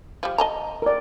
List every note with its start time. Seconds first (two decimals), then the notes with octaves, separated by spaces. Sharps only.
0.23 F3 G3
0.38 D#5 A5 A#5
0.82 A#4 D5